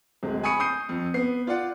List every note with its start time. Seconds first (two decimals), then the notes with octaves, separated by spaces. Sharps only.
0.23 D1 G#3
0.43 G#5 B5 C#6 D#6 C#7 D#7
0.60 D#6 G6 C7 D#7
0.89 F2
1.14 B3 C7
1.47 F4 D5 F#5